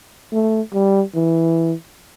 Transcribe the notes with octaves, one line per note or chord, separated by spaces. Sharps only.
A3
G3
E3